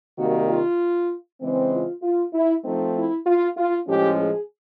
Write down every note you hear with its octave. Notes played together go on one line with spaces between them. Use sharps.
C3 D#3 G3 A#3 F#4
F4
C#3 E3 G#3 C4
F4
F4
E4
F3 A3 C4 D#4
E4
F4
F4
A2 F3 G#3 C#4 G4
G#4